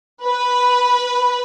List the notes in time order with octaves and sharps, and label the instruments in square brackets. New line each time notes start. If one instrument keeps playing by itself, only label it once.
[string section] B4